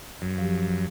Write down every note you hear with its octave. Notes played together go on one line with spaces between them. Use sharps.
F#2
F3 G4